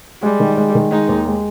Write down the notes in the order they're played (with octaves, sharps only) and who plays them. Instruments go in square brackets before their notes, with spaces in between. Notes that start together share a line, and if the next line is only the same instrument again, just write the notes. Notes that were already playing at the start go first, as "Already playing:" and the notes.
[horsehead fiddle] G3 [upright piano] G#3
[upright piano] D#3
G#3
D#3
[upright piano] G#3 [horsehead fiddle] D#4
[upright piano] D#2
G#3